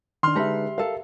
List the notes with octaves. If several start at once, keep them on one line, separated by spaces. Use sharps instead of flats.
D#3 D4 C6 F6
D3 G#3 D#4 G4 A4 B4 E5
A4 A#4 F5